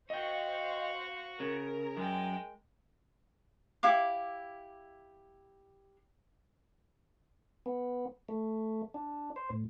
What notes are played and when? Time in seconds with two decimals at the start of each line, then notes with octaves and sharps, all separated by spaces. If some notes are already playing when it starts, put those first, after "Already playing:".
0.10 F#4 C5 D#5 F5 G5 C#6
1.40 C#3 A#4
1.97 F#2 G#3 G5
3.83 E4 G4 F5 D6
7.66 B3
8.29 A3
8.94 D4
9.36 C5
9.50 A2